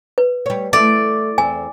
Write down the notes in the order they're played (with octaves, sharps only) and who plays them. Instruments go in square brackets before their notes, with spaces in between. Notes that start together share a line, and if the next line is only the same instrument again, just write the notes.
[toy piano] B4
[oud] G3 C#5
[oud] A3 E4 [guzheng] D5
[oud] E2 C4 [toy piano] G#5